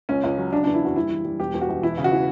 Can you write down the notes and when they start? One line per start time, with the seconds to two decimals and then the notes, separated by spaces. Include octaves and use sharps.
0.09 C#2 C#4
0.24 C#2
0.38 F#3
0.53 C#3 D4
0.64 E2 D4
0.74 E4
0.81 F#1 F#4
0.96 G3 E4
1.11 E3
1.25 G3
1.39 E1 G4
1.54 E1
1.61 F#4
1.69 E1
1.83 E3 E4
1.98 C#3
2.04 F#4
2.11 E3